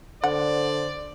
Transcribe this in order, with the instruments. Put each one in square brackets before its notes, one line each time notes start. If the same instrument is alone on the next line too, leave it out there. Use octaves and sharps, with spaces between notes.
[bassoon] D3 [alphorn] C5 [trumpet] D5 [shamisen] F#5